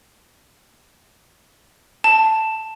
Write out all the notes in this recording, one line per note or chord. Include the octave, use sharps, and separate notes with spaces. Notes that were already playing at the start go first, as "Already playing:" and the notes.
A5